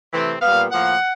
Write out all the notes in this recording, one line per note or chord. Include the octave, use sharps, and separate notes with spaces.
C3 E3 A3 C4
A#2 G3 B3 F5
A2 F3 A#3 F#5